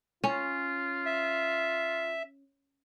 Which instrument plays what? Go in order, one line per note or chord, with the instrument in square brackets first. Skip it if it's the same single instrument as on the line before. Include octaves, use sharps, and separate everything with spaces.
[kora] C#4 [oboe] F4
[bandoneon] E5